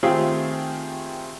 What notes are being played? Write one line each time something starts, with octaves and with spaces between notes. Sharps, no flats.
D#3 A3 C4 F4 G4 G#4